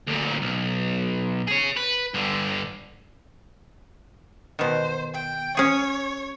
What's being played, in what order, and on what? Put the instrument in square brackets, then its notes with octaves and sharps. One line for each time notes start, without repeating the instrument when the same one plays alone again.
[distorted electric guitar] D2 A#2
B1
G#4 C#5
B4
G2 D3
[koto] B2 D#3 [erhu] C5
[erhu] G5
[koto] C#4 G#4 [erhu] C#5